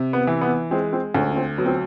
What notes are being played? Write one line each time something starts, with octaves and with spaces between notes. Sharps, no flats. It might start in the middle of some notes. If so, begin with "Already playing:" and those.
Already playing: C3
B3
E3
B3
G#3 C4
C4
D2 C#4
C#4
C4
F#3 B3
C4